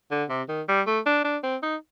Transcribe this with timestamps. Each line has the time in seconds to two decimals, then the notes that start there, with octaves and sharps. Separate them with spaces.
0.11 D3
0.29 C3
0.49 D#3
0.68 G3
0.87 A3
1.06 D4
1.24 D4
1.43 C4
1.62 D#4